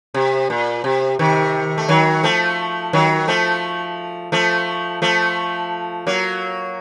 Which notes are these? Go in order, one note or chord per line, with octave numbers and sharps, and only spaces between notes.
C3
A#2
C3
C3 D#3
A3
D#3 F#3
F3 A3
D#3 F#3
F3 A3
F3 A3
F3 A3
F#3 A#3